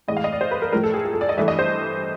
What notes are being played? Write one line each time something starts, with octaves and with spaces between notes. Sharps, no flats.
A2 E3 G#3 D#5
F5
D#5
D5
C5
B4
A#4
A2 F3 A3 A#4
A4
G#4
G#4
A4
D5
D#5
G2 E3 A3 E5
D#5
C5